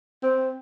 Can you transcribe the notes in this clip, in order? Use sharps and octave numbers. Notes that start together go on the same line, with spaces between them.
C4